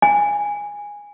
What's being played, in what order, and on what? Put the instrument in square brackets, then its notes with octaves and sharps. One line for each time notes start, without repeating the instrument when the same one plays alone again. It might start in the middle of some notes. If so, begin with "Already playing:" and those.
[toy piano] G#5